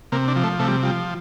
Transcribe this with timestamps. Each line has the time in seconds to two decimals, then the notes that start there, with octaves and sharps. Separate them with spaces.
0.12 C3 A#3
0.28 D4
0.36 F3
0.44 A3
0.59 C3 A3
0.68 G3
0.83 F3 G3